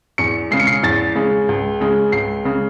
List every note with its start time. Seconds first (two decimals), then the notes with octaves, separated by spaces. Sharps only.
0.18 E2 C#7
0.51 C#3 G#3 C7
0.60 C#7
0.67 C7
0.83 E2 A6
1.15 C#3 G#3
1.49 C#2
1.81 C#3 G#3
2.12 C#2 C7
2.45 C#3 G#3